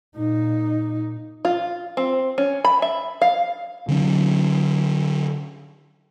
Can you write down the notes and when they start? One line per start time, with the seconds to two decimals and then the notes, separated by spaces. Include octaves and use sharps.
0.17 A#2 D#4
1.45 F4
1.97 C4
2.38 C#4
2.65 B5
2.82 E5
3.22 F5
3.88 D3 F#3 C#4